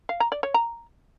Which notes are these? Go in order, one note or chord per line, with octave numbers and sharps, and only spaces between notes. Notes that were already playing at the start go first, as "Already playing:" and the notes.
F5
A#5
D5
C#5
A#5